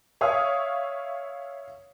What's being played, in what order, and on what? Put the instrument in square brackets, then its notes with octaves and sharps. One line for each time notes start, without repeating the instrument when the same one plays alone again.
[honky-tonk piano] C#5 E5 F5 C#6 D#6